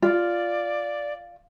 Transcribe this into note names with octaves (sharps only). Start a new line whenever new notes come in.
F4 D5